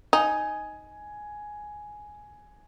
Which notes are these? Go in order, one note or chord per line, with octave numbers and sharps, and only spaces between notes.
D#4 G#5